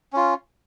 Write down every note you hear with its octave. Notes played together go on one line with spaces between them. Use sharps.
C#4 F4